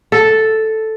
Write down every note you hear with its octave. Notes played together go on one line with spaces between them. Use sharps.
A4